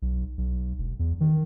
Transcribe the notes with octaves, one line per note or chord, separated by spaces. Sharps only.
B1
B1
E1
E2
D#3